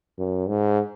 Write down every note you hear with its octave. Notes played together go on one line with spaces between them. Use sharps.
F#2
G#2